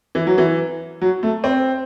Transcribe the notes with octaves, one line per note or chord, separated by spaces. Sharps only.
E3
F#3
E3
F#3
A3
C4